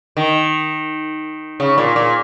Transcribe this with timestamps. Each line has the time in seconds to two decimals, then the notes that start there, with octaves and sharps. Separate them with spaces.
0.17 D#3
1.60 C#3
1.78 A#2
1.96 A#2